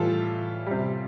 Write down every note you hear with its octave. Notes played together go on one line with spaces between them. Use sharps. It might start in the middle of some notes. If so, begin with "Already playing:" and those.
Already playing: A2 E3 G3 F4 A4
C3 G3